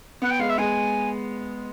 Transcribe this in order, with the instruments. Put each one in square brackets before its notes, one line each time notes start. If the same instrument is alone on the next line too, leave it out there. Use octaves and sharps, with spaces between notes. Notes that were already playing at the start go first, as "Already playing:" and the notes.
[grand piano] B3 [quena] F#5
[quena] G5
[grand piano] G#3 [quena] F5
[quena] E5
[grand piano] G#3 [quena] G#5